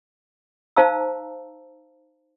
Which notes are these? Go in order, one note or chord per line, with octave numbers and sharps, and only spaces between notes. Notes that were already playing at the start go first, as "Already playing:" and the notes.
D#4 C5 F5 A5 A#5 E6